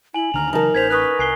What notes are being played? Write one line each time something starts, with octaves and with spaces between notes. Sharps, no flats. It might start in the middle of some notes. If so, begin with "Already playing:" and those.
E4 G#5 F#7
D2 D3 D#3 A#5 F6 F7
C#3 E3 F#3 D#4 A#4 A5
A1 C5 G#6 B6 F7
B4 C#6 D#6 F#6
C2 G#5 C7 G7